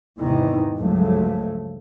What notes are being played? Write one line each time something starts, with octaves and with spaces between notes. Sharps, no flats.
E2 G#2 C3 D#3 E3
C#2 G2 F3 F#3 A3